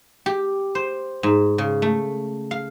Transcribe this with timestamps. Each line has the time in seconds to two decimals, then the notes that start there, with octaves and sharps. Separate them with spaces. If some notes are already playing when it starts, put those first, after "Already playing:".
0.26 G4
0.75 C5
1.23 G#2
1.58 C#3
1.82 A3
2.51 F5